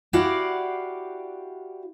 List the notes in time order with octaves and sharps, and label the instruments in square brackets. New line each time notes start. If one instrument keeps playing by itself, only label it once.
[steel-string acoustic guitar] E4 F#4 G4 D5 F5 F#5